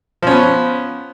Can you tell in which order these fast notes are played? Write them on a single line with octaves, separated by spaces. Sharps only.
F3 C#4 B3